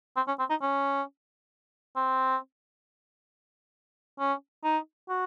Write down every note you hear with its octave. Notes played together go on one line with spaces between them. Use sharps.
C4
C#4
C4
D#4
C#4
C4
C#4
D#4
F#4